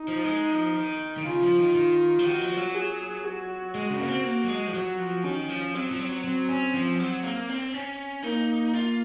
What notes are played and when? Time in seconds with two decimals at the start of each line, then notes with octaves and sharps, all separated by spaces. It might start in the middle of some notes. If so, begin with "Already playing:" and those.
Already playing: D#4
0.08 F3
0.25 G#3
0.50 F3
0.75 D#3
1.17 D#3
1.25 C#3 F4
1.42 F3
1.59 D#3
1.75 D#3
2.19 F3
2.24 D#3 F#4
2.41 F3
2.57 F#3
2.75 G#4
3.24 F#4
3.75 G#3
3.90 C#3
4.00 A#3
4.08 C4
4.24 A#3
4.44 F#3
4.49 G#3
4.67 F3
4.74 F#3 F#4
5.00 F3
5.23 D#3 C#4
5.49 F3
5.74 F#3 C4
5.91 F3
5.99 F#3
6.24 F#3 C4
6.49 C#4
6.73 F3
6.99 F#3
7.23 A#3
7.49 C4
7.73 C#4
8.23 A#3 D#4
8.74 F4